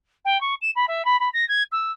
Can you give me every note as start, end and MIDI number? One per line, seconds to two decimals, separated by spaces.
0.25 0.40 79
0.41 0.54 85
0.61 0.70 100
0.75 0.85 83
0.88 1.05 76
1.05 1.16 83
1.20 1.29 83
1.33 1.47 94
1.48 1.63 92
1.72 1.91 88